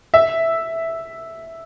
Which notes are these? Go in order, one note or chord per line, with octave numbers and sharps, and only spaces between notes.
E5